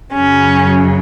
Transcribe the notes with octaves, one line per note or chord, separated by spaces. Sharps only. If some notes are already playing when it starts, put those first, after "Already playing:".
F#2 C#3 F#3 C#4